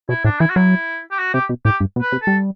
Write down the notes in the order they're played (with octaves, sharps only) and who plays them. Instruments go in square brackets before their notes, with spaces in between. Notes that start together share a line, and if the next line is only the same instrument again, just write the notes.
[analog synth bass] B2 [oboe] E4
[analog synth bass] A2 [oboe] D4
[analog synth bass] E3 [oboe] E4
[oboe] F#4
[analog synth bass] F#3 [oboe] E4
[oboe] G4
F#4
[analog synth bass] C3 [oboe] G4
[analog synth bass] B2
[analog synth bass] A2 [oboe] G4
[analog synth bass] G2
B2
[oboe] B4
[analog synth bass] C3
[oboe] A4
[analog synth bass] G3